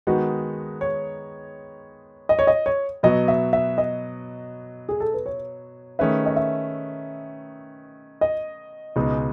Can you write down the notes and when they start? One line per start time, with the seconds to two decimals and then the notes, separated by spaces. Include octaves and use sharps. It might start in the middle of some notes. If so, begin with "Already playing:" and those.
0.07 D#3 G#3 B3 D#4 F#4
0.81 C#5
2.29 D#5
2.39 C#5
2.47 D#5
2.66 C#5
3.03 B2 F#3 B3 D#5
3.28 E5
3.53 E5
3.78 D#5
4.89 G#4
5.00 A4
5.14 B4
5.26 C#5
5.99 D#3 A3 C#4 G#4 B4 E5
6.26 D#5
6.36 E5
8.21 D#5
8.96 C#2 B2 G#3 D#4